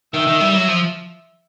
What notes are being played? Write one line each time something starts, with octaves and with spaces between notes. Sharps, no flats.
D#3 E5
D#3
G3
F#3
F3